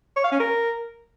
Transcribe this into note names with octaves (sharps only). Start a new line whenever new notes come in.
C#5
F5
C#4
A#4